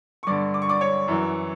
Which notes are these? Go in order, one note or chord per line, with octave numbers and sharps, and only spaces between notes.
C#6
G2 D3 D5 D6
D6
C#6
D5 D6
C#5 C#6
F#2 E3